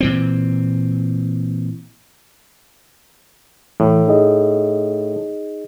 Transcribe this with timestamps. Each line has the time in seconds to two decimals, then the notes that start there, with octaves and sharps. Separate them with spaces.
0.01 A#2 E3 C4
3.80 A2 E3
4.08 D#4 G#4 D#5